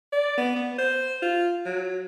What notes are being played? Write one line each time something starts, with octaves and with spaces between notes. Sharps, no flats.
D5
B3
B3
C5
F4
F#3